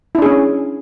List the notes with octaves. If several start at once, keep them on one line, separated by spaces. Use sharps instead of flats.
C#4 D4 E4 G#4